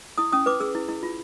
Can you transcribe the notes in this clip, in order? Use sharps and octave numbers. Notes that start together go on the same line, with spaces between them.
E4 D#6
C#4 D#6
B4 D6
G#4 E6
E4
E4
F4